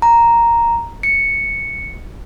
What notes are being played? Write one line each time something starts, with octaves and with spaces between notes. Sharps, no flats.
A#5
C#7